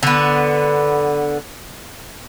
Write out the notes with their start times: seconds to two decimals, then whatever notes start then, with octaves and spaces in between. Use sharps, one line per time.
0.03 D3 B3